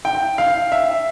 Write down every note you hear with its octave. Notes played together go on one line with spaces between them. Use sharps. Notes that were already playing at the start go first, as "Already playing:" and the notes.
G5
F5
E5